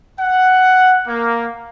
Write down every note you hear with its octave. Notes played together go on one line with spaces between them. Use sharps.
F#5
A#3